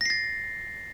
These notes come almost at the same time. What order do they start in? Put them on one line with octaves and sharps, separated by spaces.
A#6 C7 A6